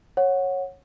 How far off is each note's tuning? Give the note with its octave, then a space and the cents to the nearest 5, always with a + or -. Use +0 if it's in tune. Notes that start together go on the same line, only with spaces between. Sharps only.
C#5 -15 F#5 -10